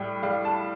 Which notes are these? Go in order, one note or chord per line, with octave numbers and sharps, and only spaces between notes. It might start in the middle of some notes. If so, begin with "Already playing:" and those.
Already playing: A2 G3 G5
G3 F5
A5